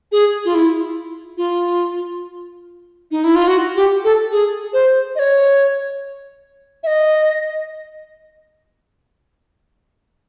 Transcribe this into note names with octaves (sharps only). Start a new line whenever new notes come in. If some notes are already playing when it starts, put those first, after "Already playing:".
G#4
F4
E4
F4
D#4
E4
F4
F#4
G4
A4
G#4
C5
D#5
C#5
E5
D#5